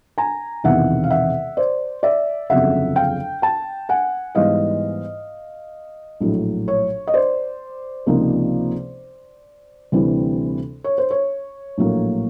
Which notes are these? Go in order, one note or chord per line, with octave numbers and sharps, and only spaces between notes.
G#5 A#5
E1 E2 C3 D#3 E5 F#5
F5
E5 F#5
C5 D5
D5 E5
G1 F2 C#3 F#3 E5 F#5
F5 G5
G5 A5
F#5 G#5
G#2 E3 G3 B3 D#5 F5
A#1 A2 F#3
C#5
D#5
C5 D5
C#2 C3 F3 A#3 D#4
D2 C3 E3 G3 C4
C#5
C5
C#5
A#1 A2 F#3 A#3